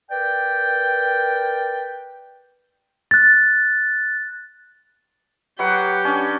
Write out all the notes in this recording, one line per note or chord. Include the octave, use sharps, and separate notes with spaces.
A#4 B4 D5 G5
F#6 A6
F#3 G4 B4 F#5
C#4 D4